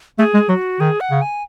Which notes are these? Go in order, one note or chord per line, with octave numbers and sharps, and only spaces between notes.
A3 G#4
G#3
F#3 F#4
D#3 G#4
F#5
C#3
G#5